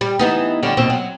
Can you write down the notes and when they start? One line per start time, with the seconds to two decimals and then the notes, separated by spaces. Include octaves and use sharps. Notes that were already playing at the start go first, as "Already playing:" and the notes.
0.01 G3
0.19 E3 B3 D#4
0.63 D3 G3 C#4
0.77 D#2 B2 C4
0.90 F#3